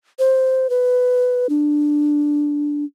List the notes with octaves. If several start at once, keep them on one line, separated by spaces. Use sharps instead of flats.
C5
B4
D4